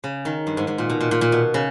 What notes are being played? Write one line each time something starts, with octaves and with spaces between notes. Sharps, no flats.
C#3
D#3
G2
G#2
G#2
A#2
B2
A#2
A#2
A#2
B2
C#3